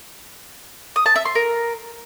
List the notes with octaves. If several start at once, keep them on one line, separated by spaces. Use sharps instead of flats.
D#6
A5
E5
C6
A#4